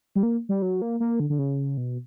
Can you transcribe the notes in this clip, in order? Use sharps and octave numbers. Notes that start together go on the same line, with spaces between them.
G3
A#3
G3
F#3
A#3
A#3
D3
D3
C#3
B2